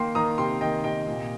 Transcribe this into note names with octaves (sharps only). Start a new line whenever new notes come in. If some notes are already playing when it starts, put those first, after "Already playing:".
Already playing: D#3 A#3 G5 C6
D#3 A#5 D#6
C3 G5 C6
D#3 D#5 G5
C3 D#5 G5
A#2